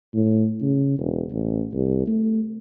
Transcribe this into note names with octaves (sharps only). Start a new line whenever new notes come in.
A2
C#3
E1
A1
C2
A3